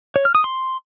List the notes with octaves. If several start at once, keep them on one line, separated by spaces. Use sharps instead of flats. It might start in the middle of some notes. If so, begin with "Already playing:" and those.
C#5
F6
D#6
C6